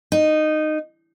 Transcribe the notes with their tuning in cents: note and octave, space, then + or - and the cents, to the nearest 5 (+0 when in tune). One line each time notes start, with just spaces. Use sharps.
D#4 -15